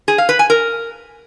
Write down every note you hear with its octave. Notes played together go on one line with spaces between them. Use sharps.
G#4
F5
B4
G#5
A#4